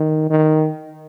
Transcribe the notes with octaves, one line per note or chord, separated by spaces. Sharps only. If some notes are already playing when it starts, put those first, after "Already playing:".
Already playing: D#3
D#3